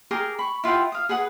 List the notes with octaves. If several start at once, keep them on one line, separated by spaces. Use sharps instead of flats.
G#4 A#4 G5 D6
B5 C#6
E4 F4 F#5 G5
F5 D#6
G#4 B4 F#5 D#6